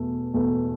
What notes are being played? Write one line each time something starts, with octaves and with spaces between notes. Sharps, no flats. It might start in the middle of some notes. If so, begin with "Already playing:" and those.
Already playing: E2 B2 A3
E2 B2 A3